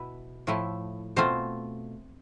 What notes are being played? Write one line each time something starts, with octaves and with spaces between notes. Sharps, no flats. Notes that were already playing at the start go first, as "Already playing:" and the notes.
Already playing: B2 E4 B4
A2 F3 A3 E4
B2 A3 C4 F4 C5